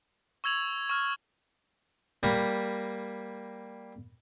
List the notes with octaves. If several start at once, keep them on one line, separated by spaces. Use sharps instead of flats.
C#6 E6 G#6 F7 F#7
C#6 F6
G3 A#3 A#5 B5 C#6